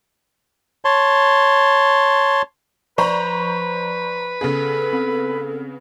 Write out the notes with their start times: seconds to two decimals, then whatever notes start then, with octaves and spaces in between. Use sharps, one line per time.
0.85 C#5 A5 C6
2.98 F3 B4 C5 D5 A#5 B5 C#6
4.41 C#3 B3 G#4 A4
4.93 C4